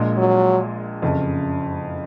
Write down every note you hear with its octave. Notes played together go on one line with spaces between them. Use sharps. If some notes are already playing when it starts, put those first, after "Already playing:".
Already playing: A#1 A#2 G#3
F#3
F#1 F2 C#3